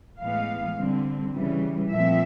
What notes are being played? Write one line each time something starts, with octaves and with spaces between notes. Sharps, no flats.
A2 E3 G#3 B3 F5
D3 G3 C4
C#3 E3 G3
A#2 F3 A3 C4 E5